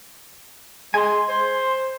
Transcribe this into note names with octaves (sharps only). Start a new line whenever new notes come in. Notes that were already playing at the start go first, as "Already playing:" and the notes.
G#3 G#5 C6
C5